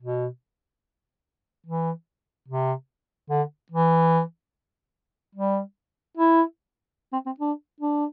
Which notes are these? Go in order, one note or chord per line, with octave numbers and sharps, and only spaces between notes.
B2
E3
C3
D3
E3
G3
E4
C4
C4
D4
D4